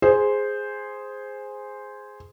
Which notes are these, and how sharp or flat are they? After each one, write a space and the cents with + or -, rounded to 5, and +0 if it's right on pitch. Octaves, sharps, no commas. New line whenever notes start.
G#4 +0 C5 +0